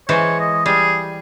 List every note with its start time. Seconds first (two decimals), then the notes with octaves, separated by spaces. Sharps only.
0.09 E3 G#3 C5 C#5
0.40 D#5
0.66 G3 G#4